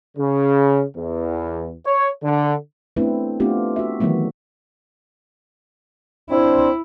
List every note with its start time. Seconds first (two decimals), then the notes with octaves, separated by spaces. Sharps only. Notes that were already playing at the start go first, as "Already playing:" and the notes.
0.17 C#3
0.97 E2
1.85 C#5
2.23 D3
2.96 A3 B3 C4 D4 E4 B4
3.40 A3 B3 C4 D4 F4 G4
3.76 F#4 E5
4.00 D#3 E3 F#3 A3 B3
6.30 C4 D4 E4 C5